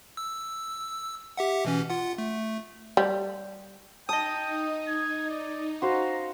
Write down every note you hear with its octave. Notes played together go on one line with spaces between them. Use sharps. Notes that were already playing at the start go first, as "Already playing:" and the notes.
E6
G4 E5 F#5
B2 E3 C#4
F4 F#5
A3
G3
D#4 D#5 G5 A5 D#6
G#6
D5
F#4 C5 F5 A#5